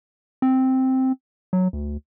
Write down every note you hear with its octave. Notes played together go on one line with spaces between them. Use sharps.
C4
F#3
D2